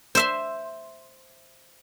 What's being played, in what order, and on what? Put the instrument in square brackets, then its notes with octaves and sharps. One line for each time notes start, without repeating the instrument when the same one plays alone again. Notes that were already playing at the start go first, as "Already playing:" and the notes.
[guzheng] C5 E5 C6